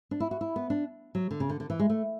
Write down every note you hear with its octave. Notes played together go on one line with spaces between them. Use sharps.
D4
E4
F#4
E4
B3
D4
F#3
D3
C#3
D3
D3
E3
G#3
A3